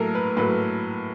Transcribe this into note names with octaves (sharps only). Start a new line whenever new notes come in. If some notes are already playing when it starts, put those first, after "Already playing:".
Already playing: A2 F#3 A#3 A4 A#4
B4
A2 F#3 A#3 B4